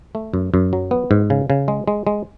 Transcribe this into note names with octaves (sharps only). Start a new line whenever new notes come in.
A3
F#2
F#2
F#3
B3
G#2
C#3
C#3
G#3
G#3
G#3